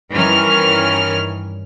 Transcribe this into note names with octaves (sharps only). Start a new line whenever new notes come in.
G2 D#3 E3 C#4 A#4 F6